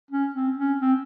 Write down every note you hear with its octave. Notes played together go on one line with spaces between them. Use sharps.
C#4
C4
C#4
C4